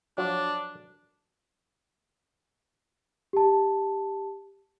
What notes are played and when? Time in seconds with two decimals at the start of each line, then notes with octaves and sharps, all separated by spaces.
0.18 F3 F#3 D4
3.33 G4 A5